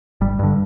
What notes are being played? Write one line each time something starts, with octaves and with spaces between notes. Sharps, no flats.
G1 G3
G2 D3